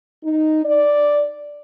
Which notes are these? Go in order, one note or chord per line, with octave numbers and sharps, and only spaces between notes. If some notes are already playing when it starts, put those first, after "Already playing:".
D#4
D5